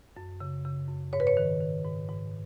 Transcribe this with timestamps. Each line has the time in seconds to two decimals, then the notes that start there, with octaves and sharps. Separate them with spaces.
0.17 F#2
0.40 C#3
0.65 C#3
0.89 F#2
1.13 G#2 C#5
1.20 B4
1.27 C#5
1.37 D#3
1.60 D#3
1.85 G#2
2.09 G#2